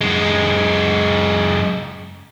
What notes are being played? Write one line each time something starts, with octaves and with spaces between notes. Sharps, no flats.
F#2 G#3